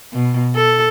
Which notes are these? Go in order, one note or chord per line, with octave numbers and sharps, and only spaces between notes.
B2
A4